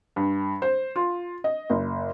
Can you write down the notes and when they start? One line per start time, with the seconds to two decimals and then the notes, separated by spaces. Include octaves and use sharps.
0.16 G2
0.62 C5
0.96 F4
1.44 D#5
1.70 F#1